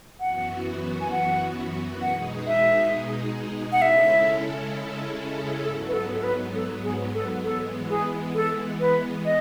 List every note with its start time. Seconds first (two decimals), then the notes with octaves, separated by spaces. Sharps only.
0.20 F#2 E3 B3 F#4 F#5
1.01 G#5
1.11 F#5
2.02 B2 G#3 D#4 G#4 F#5
2.47 E5
3.72 F#5
3.82 C#3 G#3 C#4 E4 A4 E5
5.63 G#2 F#3 B3 A4
5.88 B4
5.93 A4
6.14 A4
6.23 B4
6.54 A4
6.83 G#4
7.14 A4
7.44 E3 G#3 B3 A4
7.89 G#4
8.35 A4
8.80 B4
9.25 D#5